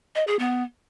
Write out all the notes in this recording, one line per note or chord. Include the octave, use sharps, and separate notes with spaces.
D#5
G#4
B3